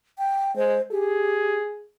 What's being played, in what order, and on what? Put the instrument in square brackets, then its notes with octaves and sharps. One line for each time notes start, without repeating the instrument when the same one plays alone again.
[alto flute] G5
[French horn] G#3 [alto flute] C5
[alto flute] G4 [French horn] G#4